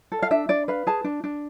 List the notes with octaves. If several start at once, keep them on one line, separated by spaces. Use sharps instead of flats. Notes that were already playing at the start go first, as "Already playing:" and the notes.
A4
F5
D4 E5
D4 D5
B4 F5
G#4 A5
D4
D4